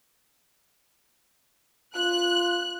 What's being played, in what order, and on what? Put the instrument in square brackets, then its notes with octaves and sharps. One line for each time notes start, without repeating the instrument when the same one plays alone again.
[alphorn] F4 [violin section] F#6